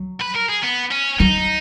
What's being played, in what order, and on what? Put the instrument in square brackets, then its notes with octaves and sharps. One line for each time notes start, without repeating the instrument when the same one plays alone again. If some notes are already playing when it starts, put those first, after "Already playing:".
Already playing: [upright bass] F#3
[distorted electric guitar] B4
A#4
G#4
B3
C#4
[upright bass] F#3 [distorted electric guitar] D#4